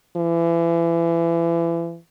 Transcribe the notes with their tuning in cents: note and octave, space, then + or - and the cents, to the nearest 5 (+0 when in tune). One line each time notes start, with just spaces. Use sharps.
E3 +30